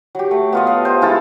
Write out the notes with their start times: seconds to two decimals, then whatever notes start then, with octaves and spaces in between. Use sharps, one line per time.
0.15 F#3 G4
0.31 A3
0.52 B3 F4 D#5
0.67 F5 A5
0.85 C5
1.01 G#3 E4 F4 A4